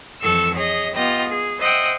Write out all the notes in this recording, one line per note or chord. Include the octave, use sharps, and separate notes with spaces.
F2 E3 A4 C#6 E6
G#4 C#5 D#5
B3 F4 G4 D#5
G#4
C5 D#5 E5 F#5 G5